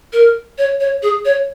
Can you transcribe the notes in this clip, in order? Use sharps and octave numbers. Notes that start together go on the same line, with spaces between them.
A#4
C#5
C#5
G#4
C#5